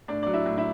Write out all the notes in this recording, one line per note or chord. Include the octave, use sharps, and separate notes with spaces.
A2 D4 D5
F#3 D5
E4 E5
A2
E4 E5